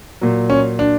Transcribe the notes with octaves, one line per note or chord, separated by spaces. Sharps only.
A#2 F#3
C#4
D4